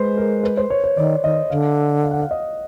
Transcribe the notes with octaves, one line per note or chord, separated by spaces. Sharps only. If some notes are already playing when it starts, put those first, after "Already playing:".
Already playing: G#3 B4 C5
A#4
B4
C5
C#5
C#5
D#3 D5
D#3 D#5
D3 F5
F5
F#5
F5
D#5